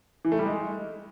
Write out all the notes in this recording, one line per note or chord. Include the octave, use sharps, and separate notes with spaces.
E3
A3
G3
G#3